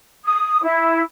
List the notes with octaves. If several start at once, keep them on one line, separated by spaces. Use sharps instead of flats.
D#6
E4